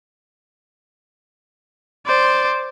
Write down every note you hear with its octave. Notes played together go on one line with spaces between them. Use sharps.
C5 D5